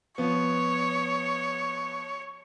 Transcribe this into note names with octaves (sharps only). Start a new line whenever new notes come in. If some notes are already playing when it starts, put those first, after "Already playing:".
F3 B3 C#5